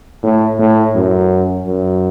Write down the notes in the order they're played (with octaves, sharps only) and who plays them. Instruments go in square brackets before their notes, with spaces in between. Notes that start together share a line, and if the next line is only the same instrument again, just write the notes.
[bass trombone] A2
A2
F#2
F#2